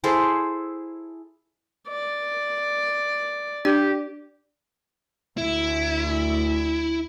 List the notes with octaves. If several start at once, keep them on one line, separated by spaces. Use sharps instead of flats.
E4 G#4 A4 C5
D5
D4 G4 D5
D2 E4